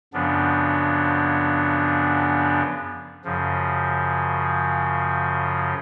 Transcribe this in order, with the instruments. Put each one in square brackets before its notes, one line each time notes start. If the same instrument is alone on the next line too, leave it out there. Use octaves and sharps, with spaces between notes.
[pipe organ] F#2 C#3 F3 B3 D4
F#2 C#3 F3